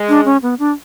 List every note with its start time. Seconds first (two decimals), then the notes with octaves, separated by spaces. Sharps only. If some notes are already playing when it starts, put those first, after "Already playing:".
Already playing: G#3
0.09 D4
0.25 C#4
0.43 B3
0.59 D4